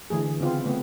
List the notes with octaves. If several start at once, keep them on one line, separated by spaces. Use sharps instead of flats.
D3 E3 A3 G#4
C#3 B3 C4 F4
A3 B3 C4